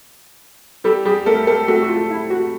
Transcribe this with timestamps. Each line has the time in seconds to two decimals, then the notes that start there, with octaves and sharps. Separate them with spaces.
0.84 G3 G4 A4
1.05 G3 G4 G#4
1.26 A3 A4 A#4
1.47 A3 A4 A#4
1.68 A3 F#4 A4
1.83 F#4
1.89 F4
2.10 E4
2.30 F#4